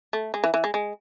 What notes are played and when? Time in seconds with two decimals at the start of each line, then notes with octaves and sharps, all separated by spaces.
0.13 A3
0.34 G#3
0.44 E3
0.54 E3
0.64 G#3
0.74 G#3